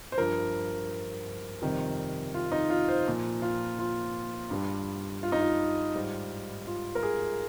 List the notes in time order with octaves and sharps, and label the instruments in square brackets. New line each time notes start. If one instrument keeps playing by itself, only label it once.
[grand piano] C5
G2 F3 A#4
F2 C3 D#3 G3
F4
D#4
F4
C5
A#2 F3
F4
F4
G2 G3
F4
D#4
F4
G#2 G3
F4
A#4
G#4